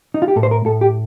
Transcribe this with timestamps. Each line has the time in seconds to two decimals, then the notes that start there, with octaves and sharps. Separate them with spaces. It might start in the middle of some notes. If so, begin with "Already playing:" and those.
0.14 D#4
0.22 F4
0.28 G4
0.36 A2 A4
0.43 C5
0.51 A#4
0.66 A2 A4
0.81 G4